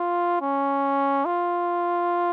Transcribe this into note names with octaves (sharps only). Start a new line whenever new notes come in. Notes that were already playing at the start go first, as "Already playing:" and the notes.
Already playing: F4
C#4
F4